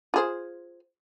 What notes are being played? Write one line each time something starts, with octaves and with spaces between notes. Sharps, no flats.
F4 G#4 C5